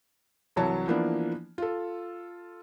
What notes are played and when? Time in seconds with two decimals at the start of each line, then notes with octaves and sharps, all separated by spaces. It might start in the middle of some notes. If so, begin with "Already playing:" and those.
0.56 C2 E3 F#3 C#5 A5
0.87 E3 F3 A#3 B3 D4 E4
1.58 F4 A4